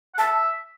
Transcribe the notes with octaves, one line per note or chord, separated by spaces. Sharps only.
F#5
E5 A5